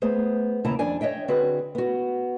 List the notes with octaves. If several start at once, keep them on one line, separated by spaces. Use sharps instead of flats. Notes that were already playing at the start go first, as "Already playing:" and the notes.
A3 B3 G#4 C5
D#2 C#3 E4 A5 A#5
F2 D4 D5 G#5
C#5 D#5 E5 G5
D3 C4 F#4 G#4 B4
B3 F#4